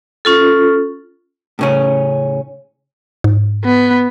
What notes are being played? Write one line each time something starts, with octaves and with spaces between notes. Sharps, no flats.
C#4 F4 A4
A2 C#3 C#4
G#2
B3